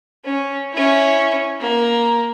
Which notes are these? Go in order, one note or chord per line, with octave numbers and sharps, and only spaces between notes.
C#4
C#4 E4
A#3